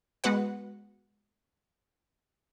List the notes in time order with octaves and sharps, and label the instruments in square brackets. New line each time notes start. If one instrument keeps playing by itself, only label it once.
[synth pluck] G#3 B3 F#4 B4 F#5